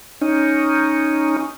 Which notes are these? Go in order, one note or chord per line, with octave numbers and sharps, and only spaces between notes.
C#4 D#4